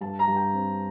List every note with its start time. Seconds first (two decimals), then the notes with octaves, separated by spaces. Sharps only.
0.01 G2 A5
0.19 A#5
0.27 G2
0.36 G5
0.54 C4